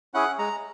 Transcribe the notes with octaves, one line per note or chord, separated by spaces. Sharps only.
C#4 E4 G#4 F#5
G#3 A#5